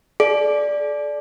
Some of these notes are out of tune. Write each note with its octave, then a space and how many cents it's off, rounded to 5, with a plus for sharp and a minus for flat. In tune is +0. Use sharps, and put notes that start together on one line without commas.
A4 -45 D5 +0